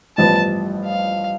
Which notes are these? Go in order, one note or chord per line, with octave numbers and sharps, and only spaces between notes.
A1 G2 F3 B3 A5
F5